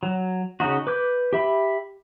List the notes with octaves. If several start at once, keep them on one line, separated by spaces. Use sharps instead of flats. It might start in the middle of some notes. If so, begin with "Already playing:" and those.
F#3
C#3 C#4 D#4 F#4
B4 D6 G6
G4 E5 B5